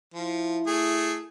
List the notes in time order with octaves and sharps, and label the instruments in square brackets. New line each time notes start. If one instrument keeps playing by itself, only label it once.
[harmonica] F3 [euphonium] E4
[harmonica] A3 G#4